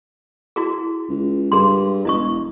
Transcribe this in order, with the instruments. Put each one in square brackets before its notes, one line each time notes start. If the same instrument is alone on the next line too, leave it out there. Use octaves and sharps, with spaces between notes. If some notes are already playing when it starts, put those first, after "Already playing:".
[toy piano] E4 F#4 G#4
[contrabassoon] C#2
[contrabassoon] G2 [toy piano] G#4 C6
[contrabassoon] E1 [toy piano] E4 D#5 C#6